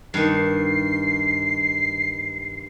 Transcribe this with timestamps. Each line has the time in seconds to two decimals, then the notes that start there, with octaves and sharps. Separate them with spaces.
0.14 G2 D#3 C7